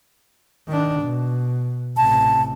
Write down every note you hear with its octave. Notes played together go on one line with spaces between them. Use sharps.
D#3 D4
B2
A1 C3 A5